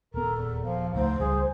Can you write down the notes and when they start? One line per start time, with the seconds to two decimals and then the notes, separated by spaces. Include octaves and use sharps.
0.14 D#1 B3 A4 A#4
0.36 E2
0.65 F3 F5
0.94 C#2 G#2 A3 C5
1.20 C#2 G3 G#4